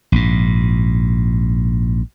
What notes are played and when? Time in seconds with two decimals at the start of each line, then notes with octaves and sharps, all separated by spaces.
0.12 A#1 G#2